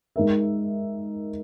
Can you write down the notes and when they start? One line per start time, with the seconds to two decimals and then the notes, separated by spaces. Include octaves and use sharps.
0.16 G#3 D#4 A#4 E5